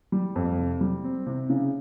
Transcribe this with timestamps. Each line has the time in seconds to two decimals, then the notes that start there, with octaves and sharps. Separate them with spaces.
0.12 G3
0.36 F2
0.58 C3
0.81 G3
1.04 C4
1.26 C3
1.50 C#3